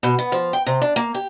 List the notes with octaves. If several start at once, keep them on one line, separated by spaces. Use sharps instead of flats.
B2
B3
F3
G5
C3
D4
A#3
G4